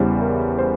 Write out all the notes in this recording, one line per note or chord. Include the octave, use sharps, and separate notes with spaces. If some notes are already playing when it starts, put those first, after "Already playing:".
Already playing: E2 C#3 E3 G3 C5
A#4
C5